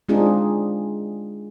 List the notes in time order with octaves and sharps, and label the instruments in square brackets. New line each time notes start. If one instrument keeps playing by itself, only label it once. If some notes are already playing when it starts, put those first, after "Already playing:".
[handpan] G#3 C4 D4 D#4 F4 G#4